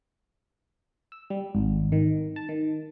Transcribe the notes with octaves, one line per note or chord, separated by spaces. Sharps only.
E6
G3
G#1
D#3
A5
D#3